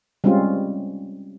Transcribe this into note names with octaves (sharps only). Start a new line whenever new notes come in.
G3 G#3 C4 C#4 F4